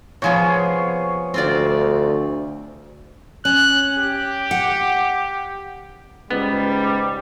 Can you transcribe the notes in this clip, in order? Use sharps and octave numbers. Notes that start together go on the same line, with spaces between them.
C3 F3 B3 G#4 C#5
D2 C4 F4 D5
C#4 F#6
G4
F#5
C#2 G#2 G3 B3